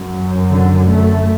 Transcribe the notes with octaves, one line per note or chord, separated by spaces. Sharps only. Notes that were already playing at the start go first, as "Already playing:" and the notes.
Already playing: F#2
D3
A3